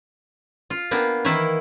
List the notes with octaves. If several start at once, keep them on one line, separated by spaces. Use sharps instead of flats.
F4
A#3 B3 D4 G5
D#3 E3 A#3 E4